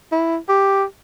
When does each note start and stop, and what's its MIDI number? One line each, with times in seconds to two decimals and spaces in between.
0.12 0.36 64
0.49 0.84 67